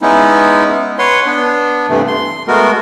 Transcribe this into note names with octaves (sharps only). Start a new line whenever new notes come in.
G#3 B3 C#4 D#4 E4
B4 C#5 F#5 C6
B3 D4
G2 C3 E3 A3
C6
G#3 A3 B3 F#4 A#4